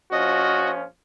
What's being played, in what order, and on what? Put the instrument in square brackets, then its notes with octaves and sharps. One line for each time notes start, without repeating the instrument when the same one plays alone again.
[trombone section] A#1 F3 C#4 [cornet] F#4 [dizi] D#5